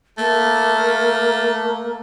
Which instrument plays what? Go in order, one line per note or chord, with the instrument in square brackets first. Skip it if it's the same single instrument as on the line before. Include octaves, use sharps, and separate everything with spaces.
[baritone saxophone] A3 [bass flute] A#3